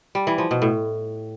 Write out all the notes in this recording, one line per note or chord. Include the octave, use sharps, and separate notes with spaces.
G3
E3
F3
B2
A2